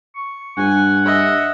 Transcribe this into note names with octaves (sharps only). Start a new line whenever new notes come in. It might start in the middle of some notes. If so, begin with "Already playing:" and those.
C#6
G2 F#5 G#5
D#5 E5